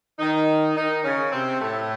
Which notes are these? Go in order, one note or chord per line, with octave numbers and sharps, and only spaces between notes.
D#3 D#4
D#3 D#4
C#3 C#4
C3 C4
A2 A3